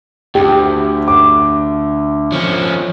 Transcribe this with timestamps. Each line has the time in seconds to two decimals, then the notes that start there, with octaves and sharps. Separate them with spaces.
0.35 D2 G4
1.08 D6
2.32 F3 C#4